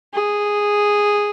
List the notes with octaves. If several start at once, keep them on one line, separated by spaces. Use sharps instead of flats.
G#4